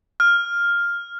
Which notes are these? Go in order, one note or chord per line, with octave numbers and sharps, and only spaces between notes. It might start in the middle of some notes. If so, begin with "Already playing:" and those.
F6